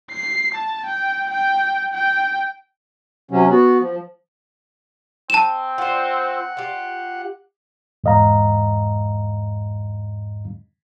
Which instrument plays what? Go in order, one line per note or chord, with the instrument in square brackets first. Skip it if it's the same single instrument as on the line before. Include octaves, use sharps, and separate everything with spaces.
[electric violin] C7
A5
G5
G5
G5
[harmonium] C3 F#3 C#4
B3 F#4
F3
[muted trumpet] C4 [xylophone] A5 E7
[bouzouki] F4 C5 [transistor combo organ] F#5
[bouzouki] F4 G4
[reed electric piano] E2 G#2 D#5 F5 A#5